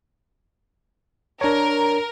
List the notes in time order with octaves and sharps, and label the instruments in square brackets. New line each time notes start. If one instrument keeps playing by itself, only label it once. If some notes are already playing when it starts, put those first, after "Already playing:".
[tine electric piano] D4 C#5 [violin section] A#4